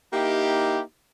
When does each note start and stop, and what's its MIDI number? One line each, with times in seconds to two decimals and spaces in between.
0.13 0.80 58
0.13 0.80 63
0.13 0.80 64
0.13 0.80 67